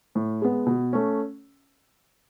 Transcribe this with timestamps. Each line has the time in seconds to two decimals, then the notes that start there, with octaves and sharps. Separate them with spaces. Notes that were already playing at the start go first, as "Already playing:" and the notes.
0.15 A2
0.42 G#3 B3
0.67 B2
0.93 A3 C#4